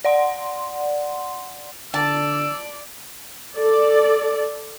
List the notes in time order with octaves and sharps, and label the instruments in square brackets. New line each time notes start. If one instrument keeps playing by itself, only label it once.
[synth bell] D5 F#5 C6
[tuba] D3 [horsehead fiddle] D5 [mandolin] A5 [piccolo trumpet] E6
[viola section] A4 D5